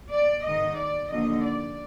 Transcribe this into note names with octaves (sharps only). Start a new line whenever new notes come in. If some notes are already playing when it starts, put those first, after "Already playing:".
D5
G#2 D#3 D#5
D5
D#2 D3 F3 D#5
D5